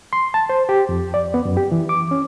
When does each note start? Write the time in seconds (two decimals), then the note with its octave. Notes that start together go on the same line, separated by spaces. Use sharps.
0.13 C6
0.34 A5
0.49 C5
0.69 G4
0.89 F2
1.14 D5
1.34 B3
1.45 F#2
1.57 G4
1.72 E3
1.89 D6
2.11 C#4